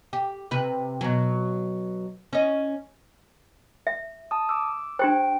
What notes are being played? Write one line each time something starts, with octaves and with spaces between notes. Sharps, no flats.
G4
C3 B4
B2 F#3
C#4 D#5
E5
A5 D#6
D6 E6
D4 G4 C5 G5